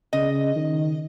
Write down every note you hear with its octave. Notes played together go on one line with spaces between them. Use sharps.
C#3 D#5
D#3